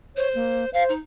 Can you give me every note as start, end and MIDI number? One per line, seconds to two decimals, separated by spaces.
0.16 0.69 72
0.16 0.28 73
0.35 0.65 58
0.73 0.92 72
0.73 0.83 77
0.89 0.99 63